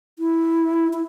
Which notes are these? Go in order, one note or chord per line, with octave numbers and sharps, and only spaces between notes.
E4
E4